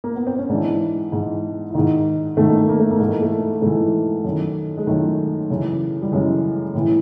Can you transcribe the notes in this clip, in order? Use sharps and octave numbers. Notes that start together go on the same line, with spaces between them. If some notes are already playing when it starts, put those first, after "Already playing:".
A#3
B3
C4
C#4
G#2 E3 D4
G#2 E3
E4
G#2 D#3 D#4
G#2 D#3 A3
A#3
A3
A#3
A3
A#3
G#2 E3 A3
A#3
A3
G#2 E3 A3
F#2 D#3
G#3
F#2 D#3 A3
F#2 C#3 E3
G3
F#2 C#3 E3 G#3
A2 E3